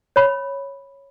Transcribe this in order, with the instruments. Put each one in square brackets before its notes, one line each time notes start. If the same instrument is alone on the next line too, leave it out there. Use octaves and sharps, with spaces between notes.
[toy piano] C#5 B5